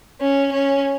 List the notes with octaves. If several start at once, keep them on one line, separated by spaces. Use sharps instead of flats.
C#4
C#4